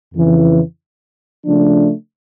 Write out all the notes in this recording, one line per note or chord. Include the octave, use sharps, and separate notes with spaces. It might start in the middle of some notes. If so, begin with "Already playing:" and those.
F2 C#3 E3
C#3 F3 A3 D4